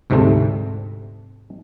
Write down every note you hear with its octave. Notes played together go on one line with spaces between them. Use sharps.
D2 G#2 C3 G3 A3 C4